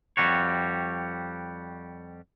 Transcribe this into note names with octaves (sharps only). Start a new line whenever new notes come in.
F2 G3 F#4 C#5